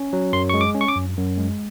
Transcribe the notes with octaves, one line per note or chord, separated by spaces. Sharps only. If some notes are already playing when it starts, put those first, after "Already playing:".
Already playing: C#4
F#3
F#2 C6
G#3 C#6
D6
C#4
C#6
D6
F#2
F#2
G#3